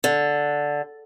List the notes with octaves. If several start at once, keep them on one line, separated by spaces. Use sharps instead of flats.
D3